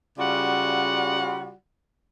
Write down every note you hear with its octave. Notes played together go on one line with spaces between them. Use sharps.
C#3 G3 F4 F#4 D5 F#5